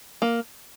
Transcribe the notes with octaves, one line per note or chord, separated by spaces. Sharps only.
A#3